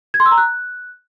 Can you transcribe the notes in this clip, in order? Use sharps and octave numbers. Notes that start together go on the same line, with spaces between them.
G#6
C6
E6
A#5
F#6